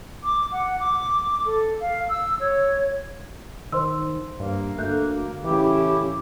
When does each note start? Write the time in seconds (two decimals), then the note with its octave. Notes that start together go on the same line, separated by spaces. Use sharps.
0.24 D6
0.52 F#5
0.80 D6
1.45 A4
1.81 F5
2.09 E6
2.40 C#5
3.72 D#3 C5 C6 E6
4.40 G2 A#3
4.78 D2 A3 F#6 G6
5.44 A1 C#3 E3 E4 G4